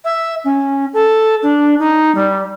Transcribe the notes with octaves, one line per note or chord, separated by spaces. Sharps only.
E5
C#4
A4
D4
D#4
G3